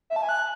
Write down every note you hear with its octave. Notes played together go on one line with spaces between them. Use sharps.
E5
A5
G#5
F#6